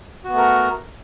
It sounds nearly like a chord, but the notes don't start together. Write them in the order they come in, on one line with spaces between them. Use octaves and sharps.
F#4 B3 A3 A#4